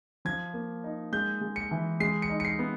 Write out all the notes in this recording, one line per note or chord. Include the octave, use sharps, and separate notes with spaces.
F3 G#6
A#3
D#4
G#3 G6
G#3
C#7
E3
G#3 C7
C#7
D#4
C#7
C7
B3